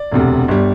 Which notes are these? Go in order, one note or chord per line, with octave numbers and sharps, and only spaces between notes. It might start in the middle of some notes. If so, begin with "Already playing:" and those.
Already playing: D5
E1 D2 C3
G1 G3